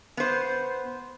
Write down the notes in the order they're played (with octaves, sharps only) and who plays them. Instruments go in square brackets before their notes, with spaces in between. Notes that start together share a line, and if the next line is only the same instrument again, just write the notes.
[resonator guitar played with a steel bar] B3 C5